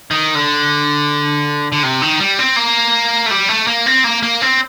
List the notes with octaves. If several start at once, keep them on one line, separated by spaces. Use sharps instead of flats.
D#3
D3
D3
C3
D#3
G3
C4
A#3
A3
G3
A3
A#3
C4
A#3
A#3
C4